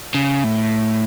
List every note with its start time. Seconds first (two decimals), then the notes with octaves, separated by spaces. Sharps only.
0.15 C#3
0.44 A2